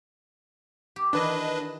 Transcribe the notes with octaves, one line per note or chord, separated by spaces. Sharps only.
G4
D#3 E3 D4 B4 D#5